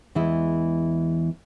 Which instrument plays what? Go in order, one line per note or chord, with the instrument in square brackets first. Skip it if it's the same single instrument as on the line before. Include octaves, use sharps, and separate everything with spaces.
[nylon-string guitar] E2 E3 G#3 E4